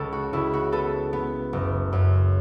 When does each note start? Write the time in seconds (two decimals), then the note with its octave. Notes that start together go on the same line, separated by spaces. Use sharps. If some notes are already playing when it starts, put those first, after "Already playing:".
Already playing: C#2 A4
0.13 F#4
0.33 C#2 E4
0.53 F#4
0.72 B3 A4
1.13 B3
1.53 F#1
1.93 F#2